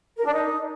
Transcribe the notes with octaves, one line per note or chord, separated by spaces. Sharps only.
A#4
D4
D#4